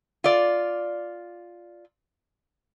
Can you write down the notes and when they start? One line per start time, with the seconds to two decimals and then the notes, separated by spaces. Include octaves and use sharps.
0.24 F4 D5